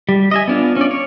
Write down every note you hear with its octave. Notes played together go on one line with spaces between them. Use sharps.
G3
D#5 E5 G#5
B3 D4 F4
C#4 D5
C#5